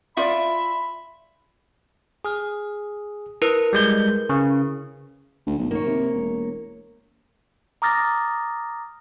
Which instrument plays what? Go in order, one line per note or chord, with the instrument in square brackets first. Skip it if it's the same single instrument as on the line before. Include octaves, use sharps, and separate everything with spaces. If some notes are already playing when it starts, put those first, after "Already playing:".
[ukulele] F4 D5 [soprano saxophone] E5 [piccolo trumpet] B5
[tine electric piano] G#4 [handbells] D#6 F6
[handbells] E4 A#4 B4
[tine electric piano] G3 G#3 G6
C#3
[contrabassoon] D2
B1
[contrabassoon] D#3 [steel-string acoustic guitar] A#3 C#5
[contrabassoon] C3
E1
[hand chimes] A#5 D6 D#6 F6 A6 A#6